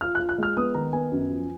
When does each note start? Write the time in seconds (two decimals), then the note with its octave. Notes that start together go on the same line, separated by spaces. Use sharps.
0.01 F4 F6
0.15 F#6
0.20 F4
0.29 F#6
0.38 G#3 F6
0.57 B3 D#6
0.74 D#3 A#5
0.93 B3 G#5
1.12 F#2
1.30 F3